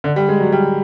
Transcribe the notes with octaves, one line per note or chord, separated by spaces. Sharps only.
D3
G3
G#3
F#3
G3